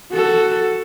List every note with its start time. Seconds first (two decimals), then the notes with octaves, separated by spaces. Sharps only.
0.12 F#4 A4